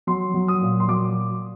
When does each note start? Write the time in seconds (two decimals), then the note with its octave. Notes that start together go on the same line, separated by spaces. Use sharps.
0.07 F#3 C6
0.34 F#3
0.48 D#6
0.61 A#2
0.80 C6
0.88 F#3 D6